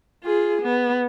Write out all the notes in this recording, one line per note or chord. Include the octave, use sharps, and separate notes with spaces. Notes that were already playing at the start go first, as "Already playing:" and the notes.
F4 G#4
B3